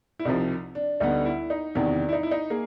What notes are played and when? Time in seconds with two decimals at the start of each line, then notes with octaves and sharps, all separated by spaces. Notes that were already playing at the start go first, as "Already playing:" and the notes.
0.19 E4
0.25 C2 C3 F3 D#4
0.75 D4
1.00 D2 D3 G3 B3 D#4
1.25 E4
1.50 D#4
1.75 E2 C3 D#3 D4
1.95 D4
2.09 E4
2.13 D#4
2.23 E4
2.31 D#4
2.50 A#3 G#4